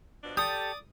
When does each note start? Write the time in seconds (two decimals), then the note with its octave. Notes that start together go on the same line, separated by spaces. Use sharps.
0.24 B2 F3 D4
0.37 G4 A4 D5 G5 D#6